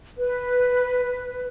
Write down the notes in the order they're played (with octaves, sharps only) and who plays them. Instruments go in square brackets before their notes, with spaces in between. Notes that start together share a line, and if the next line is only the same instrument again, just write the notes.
[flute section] B4